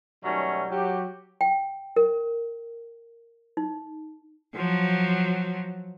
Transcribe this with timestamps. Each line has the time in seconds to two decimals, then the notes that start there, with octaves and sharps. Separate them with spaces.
0.23 B2 D#3 F#3 G3 A3 C#4
0.70 F#3 G4
1.41 G5
1.96 A#4
3.57 D#4
4.55 F3 F#3